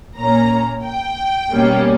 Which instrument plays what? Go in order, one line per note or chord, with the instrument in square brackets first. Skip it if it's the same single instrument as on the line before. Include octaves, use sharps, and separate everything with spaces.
[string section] A#2 A#3 C#4 A#5
G5
B2 G3 A#3 C#4